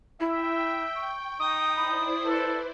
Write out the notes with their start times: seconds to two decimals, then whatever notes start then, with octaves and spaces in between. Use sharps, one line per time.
0.20 E4 E5 G5
0.95 C#6
1.40 D#4 D#6
1.76 E4 C5 D5 B5
2.25 A4 B4